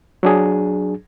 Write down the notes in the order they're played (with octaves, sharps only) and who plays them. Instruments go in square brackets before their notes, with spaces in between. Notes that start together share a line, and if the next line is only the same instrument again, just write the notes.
[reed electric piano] F#3 D4 G#4